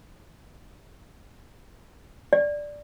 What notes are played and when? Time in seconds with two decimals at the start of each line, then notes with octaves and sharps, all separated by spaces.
2.33 D5